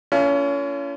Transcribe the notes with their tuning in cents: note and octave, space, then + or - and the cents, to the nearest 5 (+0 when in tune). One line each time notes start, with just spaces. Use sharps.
A#3 -40 C#4 +30 F4 -40